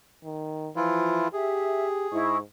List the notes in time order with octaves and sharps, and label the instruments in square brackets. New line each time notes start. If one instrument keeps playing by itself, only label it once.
[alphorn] D#3
[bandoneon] E3 E4 F4 [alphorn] F3
[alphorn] G4 [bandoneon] G#4 [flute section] E5
[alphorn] G#2 [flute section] E4 D#5 C#6